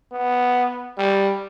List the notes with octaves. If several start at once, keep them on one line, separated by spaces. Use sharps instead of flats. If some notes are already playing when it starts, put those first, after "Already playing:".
B3
G3